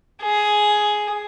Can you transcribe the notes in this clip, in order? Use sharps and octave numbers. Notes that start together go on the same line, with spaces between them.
G#4